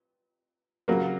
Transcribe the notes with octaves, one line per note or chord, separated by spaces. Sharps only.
C#3 F#3 A#3